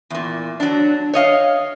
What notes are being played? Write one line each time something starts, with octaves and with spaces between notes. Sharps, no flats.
E2 A#2
F#3 D4
C#5 D#5 F5